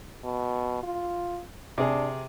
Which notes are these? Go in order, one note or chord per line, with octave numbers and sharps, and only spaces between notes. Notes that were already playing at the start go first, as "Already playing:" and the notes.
B2
F4
C3 D4 G#4